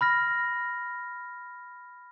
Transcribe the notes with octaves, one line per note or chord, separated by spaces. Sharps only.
B5 F6 A#6